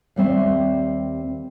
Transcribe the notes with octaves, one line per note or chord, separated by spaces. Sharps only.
D#2 G3 C4 E5